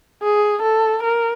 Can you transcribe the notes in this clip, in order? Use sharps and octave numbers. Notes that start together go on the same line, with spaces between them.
G#4
A4
A#4